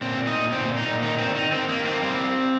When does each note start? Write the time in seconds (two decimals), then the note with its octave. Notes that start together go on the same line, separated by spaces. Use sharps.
0.01 A#2 C4
0.18 A#2
0.27 D#4
0.35 A#2
0.52 A#2 C4
0.68 A#2
0.77 D#4
0.85 A#2
1.02 D#3 D#4
1.18 D#3 C4
1.35 D#3 D#4
1.52 D#3 C4
1.68 D#3 A#3
1.85 A#3 C4
2.02 G3 C4